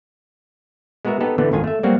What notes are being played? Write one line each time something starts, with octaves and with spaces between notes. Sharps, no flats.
G#3 B3 F#4 A#4 E5
B3 D#4 G4 A4
D3 E3 A3 B3
G#1 F2 A2 D#3 F4 G#5
A3 E5
F#3 G3 A#3 C4 F#4